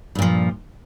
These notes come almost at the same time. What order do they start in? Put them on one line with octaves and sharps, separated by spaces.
G2 A#2 F3